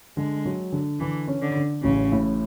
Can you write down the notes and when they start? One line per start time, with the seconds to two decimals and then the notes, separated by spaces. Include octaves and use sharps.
0.17 D3 G#3
0.45 F#3
0.72 D3
1.00 D3 E3
1.28 C#4
1.42 D3
1.56 D3
1.83 A1 C#3
2.12 A2